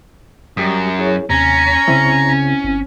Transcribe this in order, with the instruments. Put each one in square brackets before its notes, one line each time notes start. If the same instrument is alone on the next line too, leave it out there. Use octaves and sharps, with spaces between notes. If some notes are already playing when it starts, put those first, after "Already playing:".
[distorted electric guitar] F#2 [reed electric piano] G3 G4 D#6
[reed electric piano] E4 G#4 C#5
[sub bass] D#2 [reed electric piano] C3 G#5 [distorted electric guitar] C#4 [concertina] A#5
[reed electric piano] C2 C4 E4 [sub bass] C#3
[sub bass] G1